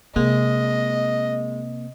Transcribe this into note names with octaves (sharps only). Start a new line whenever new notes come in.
C3 G#3 A#3 D#5